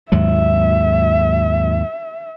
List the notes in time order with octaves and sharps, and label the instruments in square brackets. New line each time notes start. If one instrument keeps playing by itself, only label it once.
[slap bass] D#2 G#2 F#3 [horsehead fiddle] E5